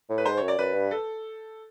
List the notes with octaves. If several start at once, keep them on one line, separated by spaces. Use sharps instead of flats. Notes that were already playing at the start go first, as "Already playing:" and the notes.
A2
B4
G#2 C5
F#2 C#5
D5
F#2 B4
G2
A4